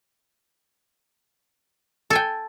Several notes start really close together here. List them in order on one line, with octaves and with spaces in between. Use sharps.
A4 G#5 G5